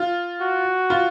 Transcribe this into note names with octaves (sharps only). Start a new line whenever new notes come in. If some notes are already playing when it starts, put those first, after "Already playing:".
Already playing: F4
F#4
F4